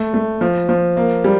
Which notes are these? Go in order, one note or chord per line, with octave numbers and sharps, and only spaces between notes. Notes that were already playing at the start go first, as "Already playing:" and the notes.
Already playing: A3
A3
F3
F3
A#3
G3